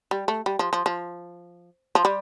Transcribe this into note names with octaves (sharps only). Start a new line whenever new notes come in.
G3
A3
G3
F3
F3
F3
F3
G3